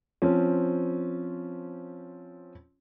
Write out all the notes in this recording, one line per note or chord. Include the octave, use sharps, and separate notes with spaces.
F3 C4 C#4